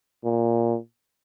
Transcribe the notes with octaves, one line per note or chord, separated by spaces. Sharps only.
A#2